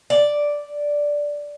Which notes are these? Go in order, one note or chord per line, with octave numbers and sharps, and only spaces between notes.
D5